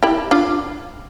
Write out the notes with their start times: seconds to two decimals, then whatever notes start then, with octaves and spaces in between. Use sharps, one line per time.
0.03 E4 G4
0.31 D4 F4